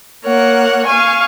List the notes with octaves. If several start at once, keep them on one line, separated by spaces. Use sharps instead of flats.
A#3 A#4 C#5 F#5
F5 G#5 C#6